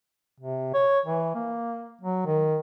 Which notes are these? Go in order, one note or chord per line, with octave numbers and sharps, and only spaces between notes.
C3
C#5
E3
A#3
F#3
D#3